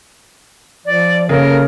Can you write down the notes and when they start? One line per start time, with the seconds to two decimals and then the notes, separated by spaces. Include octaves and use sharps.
0.86 F3 D5
1.29 C#3 A#3 A4 A#4